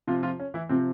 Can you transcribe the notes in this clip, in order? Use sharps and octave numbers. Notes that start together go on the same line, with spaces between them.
C3 F3 F4
F3 F4
C#4
E3 E4
C3 F3 C4